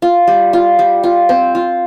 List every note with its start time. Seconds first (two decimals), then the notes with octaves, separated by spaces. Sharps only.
0.02 F4
0.27 G3
0.53 F4
0.79 G3
1.04 F4
1.29 C4
1.55 F4